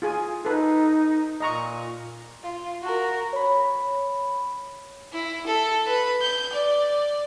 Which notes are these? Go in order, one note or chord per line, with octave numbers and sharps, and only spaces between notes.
F4 G#4 G#5
D#4 A4 B4
A#2 D#5 A#5 C#6
F4
F#4 A#4
C#5 B5
E4
A4
B4
G6
D5